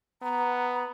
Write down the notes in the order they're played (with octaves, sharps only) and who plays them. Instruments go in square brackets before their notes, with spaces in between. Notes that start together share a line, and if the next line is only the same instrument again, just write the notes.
[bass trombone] B3 [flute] A#5